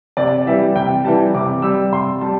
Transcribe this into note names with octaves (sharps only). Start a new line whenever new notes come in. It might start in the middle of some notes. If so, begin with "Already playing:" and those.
C3 D5
E3 G3 E5
C3 G5
E3 G3 A5
C3 D6
G3 E6
C3 C6
G3 A5